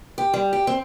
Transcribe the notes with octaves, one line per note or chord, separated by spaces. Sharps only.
G4
G3
G4
C4